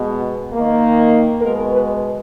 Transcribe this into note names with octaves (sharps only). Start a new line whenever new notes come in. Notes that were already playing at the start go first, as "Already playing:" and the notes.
Already playing: B2 G#3 B3
D#3 A#3
B2 G#3 B3 A#4
B4